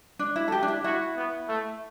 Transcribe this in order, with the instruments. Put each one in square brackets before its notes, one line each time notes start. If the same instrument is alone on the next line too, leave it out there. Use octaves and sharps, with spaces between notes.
[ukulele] D4
E4
A4
G4
D4
E4
[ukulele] E4 [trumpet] F#4
[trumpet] B3
A3